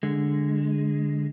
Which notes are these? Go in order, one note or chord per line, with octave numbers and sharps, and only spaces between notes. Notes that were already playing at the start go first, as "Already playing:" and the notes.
D3 G#3